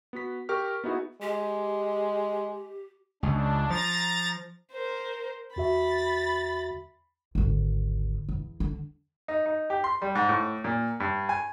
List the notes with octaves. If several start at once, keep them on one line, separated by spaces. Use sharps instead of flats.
B3 F#4 B6
G4 A#4 C#6 F6
B3 D#4 E4 F#4 G#4
G#3 G4
C#2 D4
F3 A#5 A6
A#4 C5
E2 F#4 E5 B5 A6
G#1 D2
E2
D3
D#4
D#4
G4
C6
G3
G#2
A2
A#2
G2
G#5